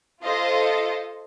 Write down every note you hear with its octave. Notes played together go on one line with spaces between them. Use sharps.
F4 A4 C5 D#5